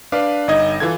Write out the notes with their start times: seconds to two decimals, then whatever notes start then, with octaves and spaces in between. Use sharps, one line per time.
0.12 D4 B4 F5 D6
0.48 G1 D#4 D#5 G#6
0.80 E3 F4 A4 G#6